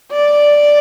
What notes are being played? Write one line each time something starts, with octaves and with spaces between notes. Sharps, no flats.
D5